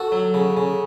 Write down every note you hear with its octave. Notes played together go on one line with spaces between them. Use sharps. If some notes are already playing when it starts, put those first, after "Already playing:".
Already playing: F#4 A4
F#3
C#3
C#3